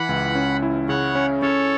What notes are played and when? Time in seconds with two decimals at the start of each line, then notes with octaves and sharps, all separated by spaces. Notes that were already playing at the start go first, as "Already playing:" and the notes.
Already playing: E3 F#5 B5
0.09 C#2
0.35 C#4
0.62 E4
0.89 C#3 C#5 F#5
1.15 C#4
1.42 C#4 A4 C#5